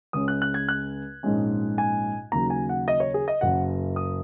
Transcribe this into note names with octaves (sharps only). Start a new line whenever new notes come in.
C#2 C#3 G#3 C#4 D#6
F#6
F#6
G#6
F#6
A#1 G#2 G#3 C#4
G#5
D#2 C#3 F#3 A#5
G#5
F#5
D#5
C#5
G#4
D#5
F#1 F#2 C#3 F#5
D#6